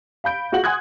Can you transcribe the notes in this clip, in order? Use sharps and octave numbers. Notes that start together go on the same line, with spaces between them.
F5 B5 G6 D7
F4 F#4 G#4 F#5 F#7
F#5 G#5 C6 D#6 F#6 G#6